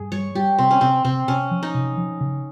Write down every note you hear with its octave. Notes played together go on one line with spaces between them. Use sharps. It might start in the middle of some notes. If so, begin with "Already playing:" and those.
Already playing: G2 G#4
G3 C#5
G3 G4
C3 C4
C#4
C3 C4
C3 C4
C3 C#4
F3
D#4
C3
F3
C#3